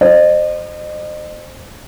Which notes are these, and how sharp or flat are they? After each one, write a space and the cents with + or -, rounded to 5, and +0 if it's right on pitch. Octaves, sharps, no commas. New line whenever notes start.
C5 +0 D#5 -40